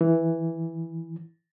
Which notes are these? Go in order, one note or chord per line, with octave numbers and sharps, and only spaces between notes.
E3